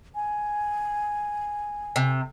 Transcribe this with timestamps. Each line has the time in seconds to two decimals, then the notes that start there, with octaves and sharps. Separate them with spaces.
0.15 G#5
1.96 C3